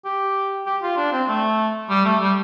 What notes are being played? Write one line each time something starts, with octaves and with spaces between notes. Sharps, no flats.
G4
G4
F4
D4
C4
A3
G3
A3
G3